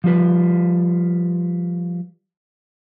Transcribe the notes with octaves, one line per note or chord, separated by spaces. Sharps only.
F3 G3 F4 B4